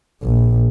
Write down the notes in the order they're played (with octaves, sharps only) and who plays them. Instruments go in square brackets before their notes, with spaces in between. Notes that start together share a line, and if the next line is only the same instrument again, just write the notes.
[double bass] A#1